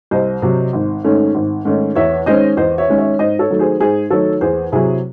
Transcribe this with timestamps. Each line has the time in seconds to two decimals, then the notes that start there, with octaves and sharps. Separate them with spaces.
0.11 C2 C5 D#5
0.42 C3 F#3
0.73 G#1
1.04 G#2 D#3 A3 C#4
1.35 G#1
1.65 G#2 D#3 A3 C#4
1.95 E2 C#5 E5
2.26 D#3 G#3 C#4 C5 D#5
2.57 E2 C5 D#5
2.78 C#5 E5
2.88 D#3 G#3 C#4
2.98 C#5 E5
3.19 G#2 C5 D#5
3.39 A4 C#5
3.50 D#3 F#3 A3
3.59 G#4 C5
3.80 G#2 G#4 C5
4.10 D#3 F#3 A3 A4 C#5
4.41 E2 G#4 C5
4.72 C3 F#3 E4 G#4